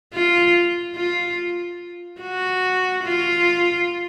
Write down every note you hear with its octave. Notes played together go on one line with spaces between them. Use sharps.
F4
F4
F#4
F4